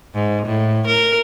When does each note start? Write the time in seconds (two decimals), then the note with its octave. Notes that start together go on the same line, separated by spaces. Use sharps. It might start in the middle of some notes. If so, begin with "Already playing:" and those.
0.15 G#2
0.46 A2
0.87 A#4